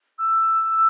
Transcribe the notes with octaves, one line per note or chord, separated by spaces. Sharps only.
E6